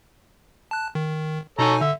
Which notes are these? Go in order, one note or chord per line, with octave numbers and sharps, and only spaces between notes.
A5 F#6
D#3
B2 D#4 A4 C#5 G#5 A#5
D3 E5